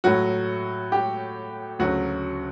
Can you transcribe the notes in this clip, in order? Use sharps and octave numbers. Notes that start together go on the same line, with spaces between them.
A2 F#3 F#4
G4
D2 C#3 F#3 F#4